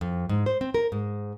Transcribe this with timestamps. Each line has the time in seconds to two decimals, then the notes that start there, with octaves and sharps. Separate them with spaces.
0.01 F2
0.29 G#2
0.46 C5
0.61 C4
0.74 A#4
0.92 G#2